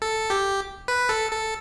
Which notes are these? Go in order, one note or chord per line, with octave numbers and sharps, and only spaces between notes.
A4
G4
B4
A4
A4